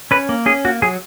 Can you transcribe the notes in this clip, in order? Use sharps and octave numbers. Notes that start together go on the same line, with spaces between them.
C#4 B4
A#3
C#4 G#4
A#3 F#4
F#3 G#4